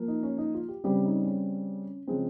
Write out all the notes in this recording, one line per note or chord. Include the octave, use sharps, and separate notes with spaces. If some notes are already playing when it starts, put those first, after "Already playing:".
Already playing: F3 A#3
D#4
C#4
D#4
F4
G4
C#3 G3 C4 G4
D#4
C#4
C#3 F3 G#3 C4 C#4